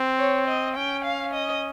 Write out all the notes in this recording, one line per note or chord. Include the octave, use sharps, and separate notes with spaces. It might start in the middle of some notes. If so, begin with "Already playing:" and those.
Already playing: C4
C#5
D#5
C#4 G5
F5
D#5